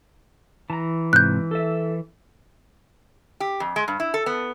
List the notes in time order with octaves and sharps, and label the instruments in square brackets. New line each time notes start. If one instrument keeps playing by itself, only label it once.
[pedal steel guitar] E3 [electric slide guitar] A5 A#5
[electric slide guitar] G#2 C3 [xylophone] F#6 G6
[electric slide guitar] A4 E5
[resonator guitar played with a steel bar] G4
F2
G#3
G2
E4
A4
B3